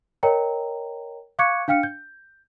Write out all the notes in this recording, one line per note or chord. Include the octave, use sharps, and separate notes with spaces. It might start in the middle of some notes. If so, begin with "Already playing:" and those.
A#4 C#5 D#5 G5 A#5
F5 C#6 D6 F#6 G#6 C#7
D4 F5 G5 F6 C#7
G6